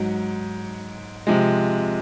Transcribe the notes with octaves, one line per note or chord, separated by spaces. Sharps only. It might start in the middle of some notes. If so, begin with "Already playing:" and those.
Already playing: G#2 F#3
C3 F3 G#3